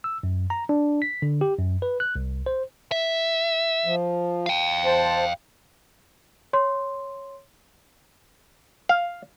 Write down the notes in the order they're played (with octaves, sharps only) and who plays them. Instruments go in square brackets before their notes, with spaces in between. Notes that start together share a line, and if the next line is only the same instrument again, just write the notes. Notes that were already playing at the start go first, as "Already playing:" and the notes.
[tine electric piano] E6
F#2
A#5
D4
B6
D3
G4
F#2
B4
F#6
C2
C5
[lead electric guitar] E5
[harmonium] F3
[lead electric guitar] F5 G5
[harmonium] C5 A5
[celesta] C#5 C6
[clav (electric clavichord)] F5